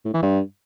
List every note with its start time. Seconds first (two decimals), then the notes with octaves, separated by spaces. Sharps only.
0.05 A2
0.14 E3
0.23 G2